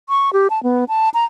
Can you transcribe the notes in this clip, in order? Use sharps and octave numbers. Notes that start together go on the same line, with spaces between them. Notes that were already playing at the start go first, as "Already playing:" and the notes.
C#6
G4
A5
B3
A5
A#5